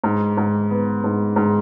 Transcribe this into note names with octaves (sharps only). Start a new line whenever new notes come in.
G#2
G#2
B3
G#2
G#2